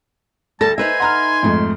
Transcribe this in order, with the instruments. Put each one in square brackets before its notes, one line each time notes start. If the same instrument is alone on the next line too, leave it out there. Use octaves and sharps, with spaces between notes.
[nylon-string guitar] D2 A4 [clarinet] G3 [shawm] A5 [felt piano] A#6
[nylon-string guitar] D#4 B4 E5 [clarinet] C5 [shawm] G#5
[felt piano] F#5 A#5 F6 [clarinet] C6
[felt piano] F2 G#2 A3